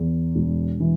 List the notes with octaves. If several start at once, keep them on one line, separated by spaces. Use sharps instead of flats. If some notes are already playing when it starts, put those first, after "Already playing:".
Already playing: E2
E1
E3